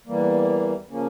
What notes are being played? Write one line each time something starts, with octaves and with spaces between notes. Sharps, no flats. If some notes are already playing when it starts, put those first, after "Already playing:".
E2 E3 G3 A#3
C#3 F3 A#3 C#4